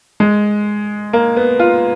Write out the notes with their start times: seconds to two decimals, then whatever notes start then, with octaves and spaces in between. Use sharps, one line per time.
0.20 G#3
1.13 A#3
1.37 B3
1.59 F4